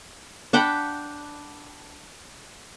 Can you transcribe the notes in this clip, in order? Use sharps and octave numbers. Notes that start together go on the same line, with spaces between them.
D4 F#5 G5 B5